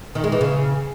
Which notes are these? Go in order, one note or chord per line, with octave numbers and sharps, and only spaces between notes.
D#3
G#3
E3
C#3